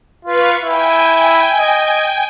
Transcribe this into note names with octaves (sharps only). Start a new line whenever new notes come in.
F4 B4 F5 C#6
E4 G5 G#5
D#5